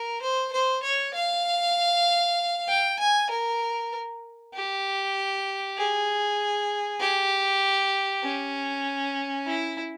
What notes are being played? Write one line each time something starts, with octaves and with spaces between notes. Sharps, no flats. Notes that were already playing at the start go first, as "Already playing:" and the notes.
Already playing: A#4
C5
C5
C#5
F5
G5
G#5
A#4
G4
G#4
G4
C#4
E4